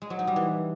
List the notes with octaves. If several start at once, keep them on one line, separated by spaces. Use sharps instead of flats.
G#3
F#3
D#4
G3
E3